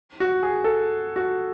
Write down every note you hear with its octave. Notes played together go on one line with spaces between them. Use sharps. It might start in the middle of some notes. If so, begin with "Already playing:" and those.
F#4
G#4
A4
F#4